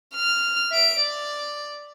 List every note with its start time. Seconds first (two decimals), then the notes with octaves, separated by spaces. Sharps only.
0.15 F6
0.71 E5 D7
1.00 D5